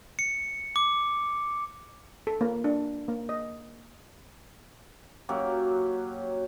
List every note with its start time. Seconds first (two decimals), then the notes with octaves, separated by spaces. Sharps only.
0.19 C#7
0.76 D6
2.27 A4
2.41 A#3
2.64 D4
3.08 A#3
3.29 D#5
5.29 F#2 F#3 A#3 G4